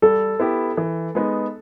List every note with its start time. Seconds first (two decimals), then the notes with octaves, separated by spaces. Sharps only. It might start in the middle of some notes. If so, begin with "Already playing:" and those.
0.02 G3 A4
0.40 B3 E4 G4
0.77 E3
1.15 G#3 B3 D#4